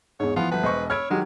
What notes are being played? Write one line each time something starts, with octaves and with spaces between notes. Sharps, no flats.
E2 G#2 C#5
E3 F3 B3 F4
G1 F#4 B4 A5
E1 C5 D#5 C#6
C#5 B5 E6 F6 G#6 D7
D#3 F#3 G#3 G4